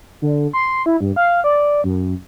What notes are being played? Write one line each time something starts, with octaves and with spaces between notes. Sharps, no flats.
D3
C6
E4
G2
F5
D5
F#2